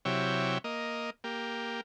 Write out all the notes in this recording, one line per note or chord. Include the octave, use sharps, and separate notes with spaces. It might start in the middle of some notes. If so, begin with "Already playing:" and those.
C3 F#3 E4 G4 C#5
A#3 D#5
A#3 G4